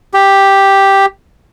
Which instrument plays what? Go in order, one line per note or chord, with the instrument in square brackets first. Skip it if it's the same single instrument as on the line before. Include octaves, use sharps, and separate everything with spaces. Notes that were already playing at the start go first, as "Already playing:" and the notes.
[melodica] G4